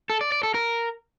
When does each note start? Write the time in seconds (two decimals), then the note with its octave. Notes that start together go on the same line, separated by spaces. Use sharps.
0.10 A4
0.21 D5
0.32 D5
0.43 A4
0.54 A#4